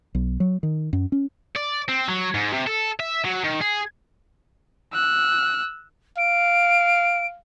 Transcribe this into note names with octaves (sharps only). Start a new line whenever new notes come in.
B1
F#3
D#3
F#2
C#4
D5
C4
F#3
G#2
C3
A4
E5
F#3
D#3
G#4
E6 F#6
F5 D7